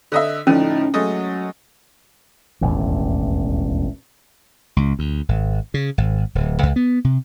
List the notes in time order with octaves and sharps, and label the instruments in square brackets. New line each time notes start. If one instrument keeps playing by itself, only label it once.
[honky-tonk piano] D3 D#5 E5
[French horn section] A2 D#4 [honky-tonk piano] D3 F3 [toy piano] C#4
[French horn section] F#3 [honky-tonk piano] G#3 A3 D#5
[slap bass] E1 A1 D#2
C#2
D2
G#1
C#3
G#1
D1
C#2
B3
C3